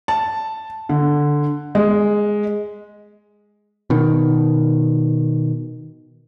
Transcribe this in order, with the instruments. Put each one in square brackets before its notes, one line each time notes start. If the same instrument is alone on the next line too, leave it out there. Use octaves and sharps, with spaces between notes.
[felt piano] A5
D3
G#3
[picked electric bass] B2 D#3